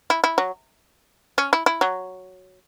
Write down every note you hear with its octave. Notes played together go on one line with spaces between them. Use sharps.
E4
E4
F#3
C#4
E4
E4
F#3